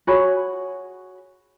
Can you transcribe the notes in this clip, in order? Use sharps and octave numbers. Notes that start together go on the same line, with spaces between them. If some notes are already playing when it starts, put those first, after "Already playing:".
F#4 G#4 C#5 B5